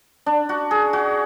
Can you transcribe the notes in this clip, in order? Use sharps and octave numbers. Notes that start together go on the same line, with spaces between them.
D4
F#4
G#4
F#4